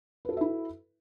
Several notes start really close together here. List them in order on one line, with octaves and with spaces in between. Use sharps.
B4 A4 F#4 E5 E4